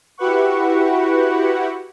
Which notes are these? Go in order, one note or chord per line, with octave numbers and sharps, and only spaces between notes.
E4 F#4 G4 B4 F#5 C#6